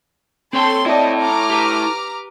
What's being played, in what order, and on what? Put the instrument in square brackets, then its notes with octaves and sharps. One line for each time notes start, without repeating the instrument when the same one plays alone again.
[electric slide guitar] C4 C#5 G5 [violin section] A4 C6
[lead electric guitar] E4 A4 [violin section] D5 D#5
[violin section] A#5 D6 F6
[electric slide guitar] G4 B4